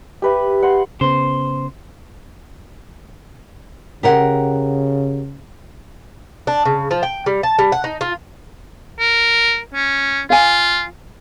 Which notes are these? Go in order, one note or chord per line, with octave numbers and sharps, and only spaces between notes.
G4 B4 E5
F#5 C6
C#3 B3 C5
C#3 G4 A#4 F#5
D4
C#3
F3
G5
G3
A5
G3
F#5
D#4
F4
A#4
C#4
F4 F5 G#5